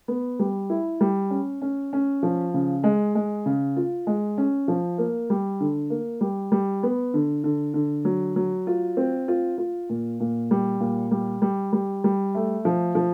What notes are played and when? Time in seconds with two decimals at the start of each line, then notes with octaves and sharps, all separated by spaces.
0.08 B3
0.39 G3
0.70 E4
1.01 G3
1.30 C#4
1.62 C#4
1.93 C#4
2.23 F3
2.54 C#3
2.84 G#3
3.15 G#3
3.46 C#3
3.76 F4
4.07 G#3
4.38 C#4
4.68 F3
4.98 A#3
5.30 G3
5.60 D3
5.90 A#3
6.21 G3
6.52 G3
6.83 B3
7.14 D3
7.44 D3
7.74 D3
8.05 F#3
8.36 F#3
8.67 F4
8.97 C4
9.28 F4
9.58 F4
9.89 A#2
10.20 A#2
10.51 G3
10.80 A#2
11.11 G3
11.42 G3
11.73 G3
12.04 G3
12.35 A3
12.65 F3
12.95 F3